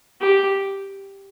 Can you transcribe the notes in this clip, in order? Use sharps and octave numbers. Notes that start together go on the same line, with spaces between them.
G4